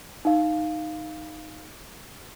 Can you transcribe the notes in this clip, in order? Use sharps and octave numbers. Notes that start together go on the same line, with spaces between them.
D#4 F5